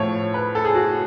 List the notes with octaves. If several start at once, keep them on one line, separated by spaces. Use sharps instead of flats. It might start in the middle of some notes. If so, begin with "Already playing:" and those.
Already playing: A2 F3 A3 C#5
B4
A4
G#4
F#4